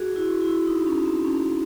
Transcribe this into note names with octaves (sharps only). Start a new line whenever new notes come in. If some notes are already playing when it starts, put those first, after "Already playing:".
Already playing: F#4 G#4
E4 F#4
E4
D#4
C#4
C4
C#4